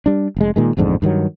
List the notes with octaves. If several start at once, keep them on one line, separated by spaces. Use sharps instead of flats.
G3 D4
F1 G#3
A#2 D#3 G#3
A1 F2 G#2 D3
G2 D#3 F3 F#3